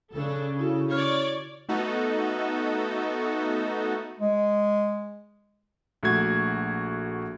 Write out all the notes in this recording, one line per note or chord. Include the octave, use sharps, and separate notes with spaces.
C#3 D4 A4
E4 F#4 A4
C#5 D5 F6
A3 B3 D#4 F#4 A4
G#3
A#1 A3 F#4 G#6